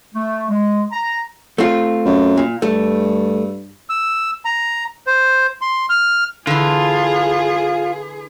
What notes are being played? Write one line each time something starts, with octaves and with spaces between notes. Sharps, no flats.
A3
G#3
A#5
A3 C4 F4
F#2
A#2
G2 A3
E6
A#5
C5
C6
F6
D3 E3 F4 G#4